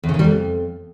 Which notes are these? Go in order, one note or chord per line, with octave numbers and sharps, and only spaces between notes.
E2
C#3
D#3
G3
F2